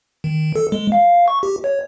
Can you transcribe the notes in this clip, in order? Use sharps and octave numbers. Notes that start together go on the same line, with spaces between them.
D#3
A4
G#3
F5
C#6
G4
C#5